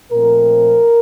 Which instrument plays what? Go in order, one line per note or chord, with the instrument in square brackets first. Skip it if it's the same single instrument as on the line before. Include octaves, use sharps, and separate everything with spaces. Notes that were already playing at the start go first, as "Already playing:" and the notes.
[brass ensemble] A#2 F3 A3 C4 A#4